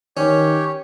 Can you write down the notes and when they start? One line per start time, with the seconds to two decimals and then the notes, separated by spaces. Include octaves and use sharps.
0.17 D#3 C#4 G4 C#5